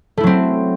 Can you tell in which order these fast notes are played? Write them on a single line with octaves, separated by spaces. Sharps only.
A3 E4 F#3 C4